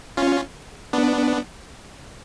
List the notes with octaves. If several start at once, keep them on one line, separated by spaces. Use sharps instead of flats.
C#4 F4
B3 D4